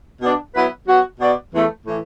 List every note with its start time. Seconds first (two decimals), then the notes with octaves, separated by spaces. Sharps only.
0.22 B2 B3 D4
0.55 F#3 B3 E4 B4
0.87 F#3 B3 F#4
1.20 B2 B3 F#4 D5
1.53 E2 E3 A3
1.86 A2 E3